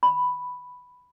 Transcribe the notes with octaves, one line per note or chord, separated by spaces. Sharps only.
B5